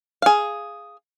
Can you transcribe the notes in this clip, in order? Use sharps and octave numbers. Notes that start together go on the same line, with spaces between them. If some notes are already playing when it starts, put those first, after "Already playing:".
G#4 F5